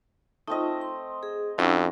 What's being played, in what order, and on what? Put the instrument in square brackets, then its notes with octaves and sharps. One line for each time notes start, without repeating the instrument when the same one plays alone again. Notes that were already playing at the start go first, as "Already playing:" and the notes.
[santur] A3 C4 D#5 [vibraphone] D#4 F4
[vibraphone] C6
G#4
[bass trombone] F2 [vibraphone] C#4 D#4 E6 [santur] E4 F#4